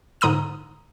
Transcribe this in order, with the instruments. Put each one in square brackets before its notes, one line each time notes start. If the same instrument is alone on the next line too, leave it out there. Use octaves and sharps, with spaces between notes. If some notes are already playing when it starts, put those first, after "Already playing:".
[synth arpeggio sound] G#2 D3 A#5 D#6 D#7